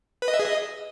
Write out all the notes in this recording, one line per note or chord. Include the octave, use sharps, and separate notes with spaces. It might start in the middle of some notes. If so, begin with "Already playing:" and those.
B4
D#5
E5
G#4
D#5